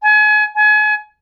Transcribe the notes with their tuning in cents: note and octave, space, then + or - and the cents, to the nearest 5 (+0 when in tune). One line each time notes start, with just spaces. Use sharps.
G#5 +35
G#5 +35